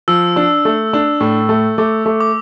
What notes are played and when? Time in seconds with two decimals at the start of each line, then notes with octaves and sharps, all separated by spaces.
0.08 F3 E6
0.36 D4
0.65 A3
0.93 D4
1.20 A2
1.49 A3
1.78 A3 D6
2.06 A3
2.21 D6